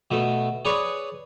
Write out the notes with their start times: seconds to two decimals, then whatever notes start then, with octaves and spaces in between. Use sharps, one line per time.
0.11 B2 A3
0.65 G#4 B4 C#5 D5